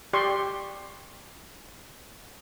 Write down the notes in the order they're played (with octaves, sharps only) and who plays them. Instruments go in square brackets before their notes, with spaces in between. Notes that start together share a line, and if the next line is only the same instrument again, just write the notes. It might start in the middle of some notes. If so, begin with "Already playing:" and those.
[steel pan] G4 D5 C6 C#6